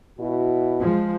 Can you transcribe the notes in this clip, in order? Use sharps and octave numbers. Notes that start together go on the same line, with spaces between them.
B2 E4 F#4
F3 G#3